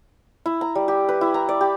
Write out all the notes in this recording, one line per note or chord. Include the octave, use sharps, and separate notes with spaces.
E4
A#5
G3
G4
B4
E4
A#5
D5
G4